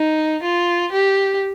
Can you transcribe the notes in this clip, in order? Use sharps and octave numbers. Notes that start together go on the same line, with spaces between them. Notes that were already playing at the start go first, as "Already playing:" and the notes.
Already playing: D#4
F4
G4